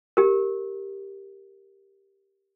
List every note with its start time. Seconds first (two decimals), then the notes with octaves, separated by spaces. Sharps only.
0.17 G4 A#4